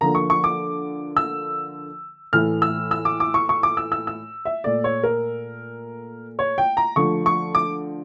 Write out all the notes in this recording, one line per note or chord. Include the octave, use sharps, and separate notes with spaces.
D3 F3 A#3 A#5
C#6
C#6
D6
E6
A2 E3 A3 F6
E6
E6
D6
D6
C#6
C#6
D6
E6
E6
E6
E5
A#2 A3 D5
C#5
A#4
C#5
G5
A#5
D3 F3 A3 C#6
C#6
D6